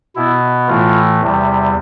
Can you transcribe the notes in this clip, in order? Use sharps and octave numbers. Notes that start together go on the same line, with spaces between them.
B2 B3 E4
A2 E3 A3 F4
E2 C3 G3